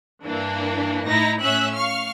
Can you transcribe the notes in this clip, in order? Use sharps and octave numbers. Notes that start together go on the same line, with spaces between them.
G2 E3 A#3 D4
A2 D#4 E4 A#5 A#6
A2 C#4 E5 E6 F#6
F5 C#6 F6